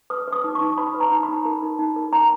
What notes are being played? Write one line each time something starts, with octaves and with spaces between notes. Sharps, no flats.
B4 D#6
B4 D#6
D#4
C#6
D#4
B4 B5
B4
A#5
D#4
B5
D#4
A#4
D#4
D#4
A#4
A#4 A#5